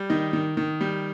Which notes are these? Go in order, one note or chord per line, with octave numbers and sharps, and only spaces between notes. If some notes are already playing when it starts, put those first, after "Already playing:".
Already playing: G3
D#3 D#5
D#3
D#3
G3